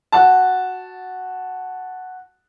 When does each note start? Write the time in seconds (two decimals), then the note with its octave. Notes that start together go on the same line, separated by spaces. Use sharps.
0.12 F#4 A5